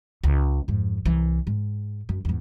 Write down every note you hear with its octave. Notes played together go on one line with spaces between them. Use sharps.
C#2
F2 G#2
C2 E3
G#2
F#2
E2 G#2